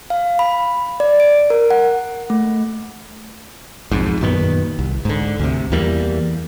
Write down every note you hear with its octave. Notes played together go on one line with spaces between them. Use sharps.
F5
B5
D5
D7
A#4
F#5
A3
B1 F2 G#2
F#2 A#2 D#3 B3
C2
G#2 D3
D2 C3
E2 E3 G3 A#3